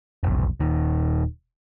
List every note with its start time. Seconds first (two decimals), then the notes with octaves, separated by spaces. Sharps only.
0.23 F1 B1
0.60 D#1 D#3